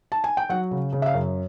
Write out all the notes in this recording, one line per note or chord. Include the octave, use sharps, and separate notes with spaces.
A5
G#5
G5
F#3 F#5
C#3
C#3
E5
F5
F#2